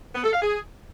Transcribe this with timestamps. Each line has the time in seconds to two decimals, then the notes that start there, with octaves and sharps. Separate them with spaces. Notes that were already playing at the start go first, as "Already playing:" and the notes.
0.15 B3
0.24 A4
0.33 F5
0.42 G#4